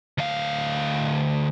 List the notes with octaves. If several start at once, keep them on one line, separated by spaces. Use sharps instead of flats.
D2 F5